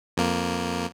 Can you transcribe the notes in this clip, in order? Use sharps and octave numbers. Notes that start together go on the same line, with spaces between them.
F2 A#3